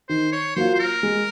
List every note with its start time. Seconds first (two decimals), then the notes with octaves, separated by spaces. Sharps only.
0.09 D#3 C5
0.32 C#5
0.56 F#3 A#3 F4 C5
0.75 C5
0.79 A#4
1.03 G#3